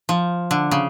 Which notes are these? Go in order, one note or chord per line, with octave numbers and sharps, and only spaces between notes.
F3
D3
C#3